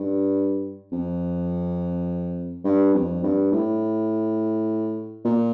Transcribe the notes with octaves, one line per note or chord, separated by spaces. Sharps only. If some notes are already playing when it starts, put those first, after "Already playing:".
Already playing: G2
F2
G2
F2
G2
A2
A#2